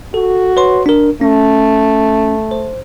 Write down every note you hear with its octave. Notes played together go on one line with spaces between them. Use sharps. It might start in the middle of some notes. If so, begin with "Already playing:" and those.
F#4 A4
B4 C#5 C6
D4 A#4
A3 C#4
C5